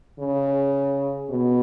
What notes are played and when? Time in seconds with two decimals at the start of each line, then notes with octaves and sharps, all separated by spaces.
0.19 C#3
1.31 B2